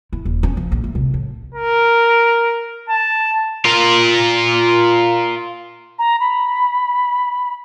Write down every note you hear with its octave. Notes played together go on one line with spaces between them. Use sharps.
E4
D#1
C#4
F3
A#1
A3
C2
A2
A#4
A5
F4 A#4
A#5
B5